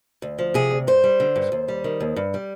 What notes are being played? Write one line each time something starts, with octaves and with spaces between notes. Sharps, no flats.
D2
F3
C3 G#4
D2
G2 C5
G3
D3
G2
D#2
G3
D#3
D#2
G2
G3